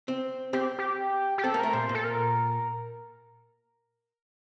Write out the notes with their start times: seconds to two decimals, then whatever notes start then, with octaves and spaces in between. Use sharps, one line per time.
0.08 C4
0.53 C4 G4
0.78 G4
1.38 G4
1.44 C4 A4
1.54 A#3
1.59 A3 A#4
1.73 A#2 C5
1.89 A#2
1.94 A4
2.04 A#4